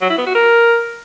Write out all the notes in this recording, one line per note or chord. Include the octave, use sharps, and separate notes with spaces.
F#3
E4
B3
F#4
A#4